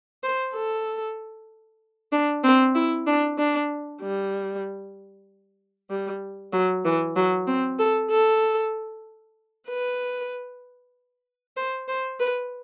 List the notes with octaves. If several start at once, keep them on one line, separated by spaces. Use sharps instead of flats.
C5
A4
D4
C4
E4
D4
D4
G3
G3
F#3
E3
F#3
C4
A4
A4
B4
C5
C5
B4